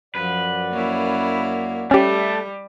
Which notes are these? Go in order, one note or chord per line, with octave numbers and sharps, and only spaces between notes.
F#2 F3 B4 D5 F#5
A#3 C#4 E4
G3 A3 C#4 G4